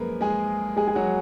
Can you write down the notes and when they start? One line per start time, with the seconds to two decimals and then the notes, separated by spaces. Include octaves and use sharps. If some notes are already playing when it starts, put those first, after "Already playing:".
Already playing: F#2 F3 G#3 A#3 A#4 B4
0.21 G#3 G#4
0.77 G#3 G#4
0.88 G#4
0.95 F#3 F#4